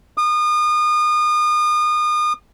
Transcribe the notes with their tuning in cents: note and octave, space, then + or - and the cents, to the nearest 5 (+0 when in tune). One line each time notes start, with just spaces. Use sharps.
D#6 -35